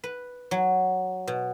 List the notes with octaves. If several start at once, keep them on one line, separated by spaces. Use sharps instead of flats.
B4
F#3
B2